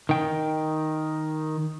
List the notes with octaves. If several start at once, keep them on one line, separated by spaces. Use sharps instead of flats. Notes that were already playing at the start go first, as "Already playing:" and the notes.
D#3 G5